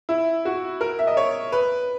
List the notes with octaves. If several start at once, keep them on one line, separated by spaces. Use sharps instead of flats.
E4
F#4
A#4
E5
D#5
C#5
B4